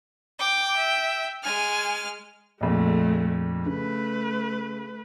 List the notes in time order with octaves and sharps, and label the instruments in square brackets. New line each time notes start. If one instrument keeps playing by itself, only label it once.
[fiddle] G5 [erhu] D6
[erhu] E5
[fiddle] G#3 F6 [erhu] G#5
[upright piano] A#1 F2 A#2 [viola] G#3 A3
[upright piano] C#3 [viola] A3 B4